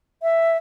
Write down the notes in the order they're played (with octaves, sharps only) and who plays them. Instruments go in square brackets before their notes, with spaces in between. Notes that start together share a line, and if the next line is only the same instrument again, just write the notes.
[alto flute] E5